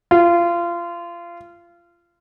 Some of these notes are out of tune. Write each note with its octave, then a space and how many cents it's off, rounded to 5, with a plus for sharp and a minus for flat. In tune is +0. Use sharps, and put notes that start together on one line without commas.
F4 -25